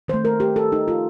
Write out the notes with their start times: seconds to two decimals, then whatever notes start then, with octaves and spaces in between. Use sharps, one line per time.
0.08 D#3 A3 C5
0.25 A#4
0.40 G4
0.56 A4
0.72 D#4
0.88 F4